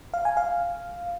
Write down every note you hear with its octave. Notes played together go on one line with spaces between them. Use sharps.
F5
G#5
F5